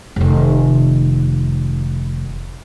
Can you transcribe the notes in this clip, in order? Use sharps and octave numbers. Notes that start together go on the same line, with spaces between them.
F1 D#3